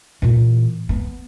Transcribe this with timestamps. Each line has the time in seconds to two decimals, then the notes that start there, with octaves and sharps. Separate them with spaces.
0.22 A#2 E3
0.89 B3